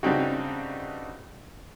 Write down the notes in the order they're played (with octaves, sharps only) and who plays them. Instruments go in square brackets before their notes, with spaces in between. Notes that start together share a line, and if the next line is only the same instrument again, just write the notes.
[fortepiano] G2 C#3 G3 C4 D#4 F#4